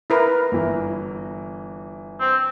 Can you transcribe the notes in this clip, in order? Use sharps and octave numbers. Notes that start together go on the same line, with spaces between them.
E4 A#4 B4
G1 E3
C4